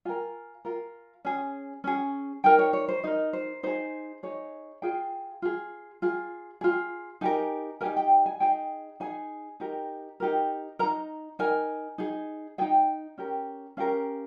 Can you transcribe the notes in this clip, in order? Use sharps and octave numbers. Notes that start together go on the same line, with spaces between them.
F4 A#4 G#5
F4 A#4
C#4 G#4
C#4 G#4
D#4 A#4 G5
C#5
C#5
C5
D#4 A#4 D#5
C5
D#4 G#4 C5
D#4 G#4 C#5
F4 G#4 G5
F4 G#4
F4 G#4
F4 G#4
D#4 G4 A#4 G#5
D#4 G4 A#4 G#5
G5
G#5
D#4 G#4 G5
D#4 G#4 G#5
D#4 G4 A#4
D#4 G4 A#4
D#4 A#4 A#5
D#4 A#4 G#5
D#4 G#4
D#4 G#4 G5
C#4 G4 A#4
C#4 G4 A#4 F5